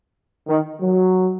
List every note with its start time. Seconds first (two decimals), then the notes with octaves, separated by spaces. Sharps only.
0.48 D#3
0.80 F#3